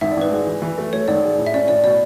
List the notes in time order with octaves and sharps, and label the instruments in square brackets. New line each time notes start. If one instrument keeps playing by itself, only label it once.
[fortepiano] G#1 [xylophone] E5
[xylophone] D5
[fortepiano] G#1 [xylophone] B4
[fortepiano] G#3
E3
E3
A3
[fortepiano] A3 [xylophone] C#5
[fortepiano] G#1 [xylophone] D5
[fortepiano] G#3
A2
[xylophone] E5
[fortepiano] C#4 [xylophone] D5
[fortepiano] A2 [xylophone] D5
[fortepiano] B2 [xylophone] D5